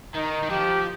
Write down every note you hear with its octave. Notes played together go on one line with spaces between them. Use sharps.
D#3 D#4
D#3
F3 G4